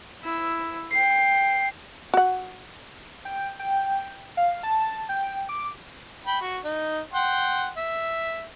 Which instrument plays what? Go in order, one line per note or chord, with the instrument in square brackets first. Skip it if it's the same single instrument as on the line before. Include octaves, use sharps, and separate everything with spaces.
[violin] E4 E6
G5 C7
[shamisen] F#4 F#5
[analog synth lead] G5
G5
F5
A5
G5
D6
[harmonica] G5 B5
F#4
D#4
F#5 G5 C6
E5